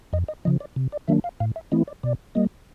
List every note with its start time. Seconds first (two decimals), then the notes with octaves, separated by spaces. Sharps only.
0.13 F2 D#5
0.28 D#5
0.45 C#3 F3 D#5
0.60 D5
0.76 C3
0.92 D5
1.08 D#3 F#3 A#3 D4 E5
1.24 F5
1.40 A2 F5
1.56 E5
1.72 E3 A3 C4 E4 D#5
1.88 D5
2.03 B2 D5
2.35 G3 A#3 D#5